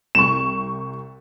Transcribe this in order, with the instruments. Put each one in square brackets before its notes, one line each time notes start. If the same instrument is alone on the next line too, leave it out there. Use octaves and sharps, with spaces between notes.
[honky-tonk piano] C2 C#6 [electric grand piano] E7